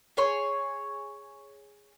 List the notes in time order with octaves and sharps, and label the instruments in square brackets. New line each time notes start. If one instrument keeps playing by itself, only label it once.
[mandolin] G#4 C#5 C6